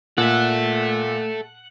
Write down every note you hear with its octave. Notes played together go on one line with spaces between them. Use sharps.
A#2 A4 E5 F#5